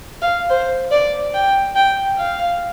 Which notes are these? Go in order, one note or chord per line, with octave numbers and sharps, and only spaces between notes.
F5
C5
D5
G5
G5
F5